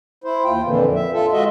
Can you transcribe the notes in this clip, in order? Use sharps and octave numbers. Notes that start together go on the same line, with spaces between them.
E4 C5
D#2 F4 G5
F2 A#2 D3 E3
E5
F4 A4
G#3 F4 F#4 D#5 E5